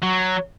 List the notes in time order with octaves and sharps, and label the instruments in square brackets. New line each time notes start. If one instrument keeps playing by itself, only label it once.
[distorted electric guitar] F#3